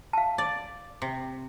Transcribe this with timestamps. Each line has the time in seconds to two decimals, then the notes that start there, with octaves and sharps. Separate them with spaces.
0.13 F5 A5
0.38 D5
1.02 C3